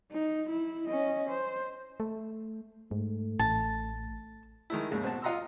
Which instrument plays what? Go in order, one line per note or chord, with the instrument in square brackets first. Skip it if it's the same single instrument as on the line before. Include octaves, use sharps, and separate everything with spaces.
[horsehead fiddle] D#4
E4
C#4 D#5
C5
[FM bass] A3
[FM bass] G#2 [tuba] A3
[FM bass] A1 [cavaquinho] A5
[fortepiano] D#3 G#3 A3 E4
D#2 G#2 C#3
B2 C4 F#4 A5
F4 D#5 F#5 A#5 C6 E6